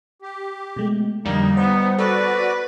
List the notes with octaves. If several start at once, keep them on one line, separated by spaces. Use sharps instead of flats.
G4
B2 G#3 A3
F2 D3 G3 A#3 D#4
B3 C5
F#4 A4 B4 D5